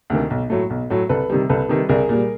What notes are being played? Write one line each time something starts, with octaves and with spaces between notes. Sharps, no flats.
D2 C3 D#3
B1
A2 F#3 A3
B1
A2 F#3 A3
C2 A4 B4
C3 D#3 G3
C2 A4 B4
C3 D#3 G3
C2 G#4 A#4
A#2 G3